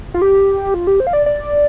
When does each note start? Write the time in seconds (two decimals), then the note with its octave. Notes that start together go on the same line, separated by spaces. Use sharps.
0.14 F4
0.22 G4
0.74 F4
0.87 G4
1.00 C5
1.07 F5
1.13 D5
1.26 D5